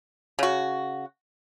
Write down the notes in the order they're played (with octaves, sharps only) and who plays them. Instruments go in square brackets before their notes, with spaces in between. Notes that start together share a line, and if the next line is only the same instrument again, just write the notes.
[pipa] C#3 F#4